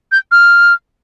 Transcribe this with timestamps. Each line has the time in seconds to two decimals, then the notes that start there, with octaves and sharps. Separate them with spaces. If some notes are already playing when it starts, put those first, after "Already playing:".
0.12 G6
0.31 F6